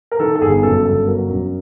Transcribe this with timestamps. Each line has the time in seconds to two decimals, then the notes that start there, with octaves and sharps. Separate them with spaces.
0.11 A#4
0.19 D#3 A4
0.35 A4
0.42 G1 G#4
0.63 F#2 A4
0.85 G1 A4
1.07 F#3 A#4
1.29 F#2